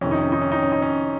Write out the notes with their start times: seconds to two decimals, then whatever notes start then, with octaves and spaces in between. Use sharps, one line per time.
0.01 F2 C3 D#3 C#4
0.11 D#4
0.21 C#4
0.32 D#4
0.41 C#4
0.52 D#4
0.62 C#4
0.72 D#4
0.82 C#4